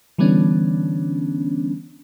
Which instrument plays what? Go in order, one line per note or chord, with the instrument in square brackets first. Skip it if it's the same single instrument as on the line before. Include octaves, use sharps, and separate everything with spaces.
[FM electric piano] D3 E3 G3 B3 C#4 D4